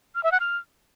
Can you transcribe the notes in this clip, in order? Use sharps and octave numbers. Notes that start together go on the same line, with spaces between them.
F6
E5
F#5
F6